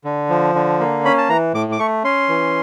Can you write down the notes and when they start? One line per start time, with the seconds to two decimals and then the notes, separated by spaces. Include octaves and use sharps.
0.04 D3
0.30 F3
0.55 D3
0.80 A#3
1.05 C#4 B5
1.18 A5
1.29 E3 A#5
1.54 A2 D6
1.72 D6
1.79 A3 C#6
2.04 C#4 C6
2.29 E3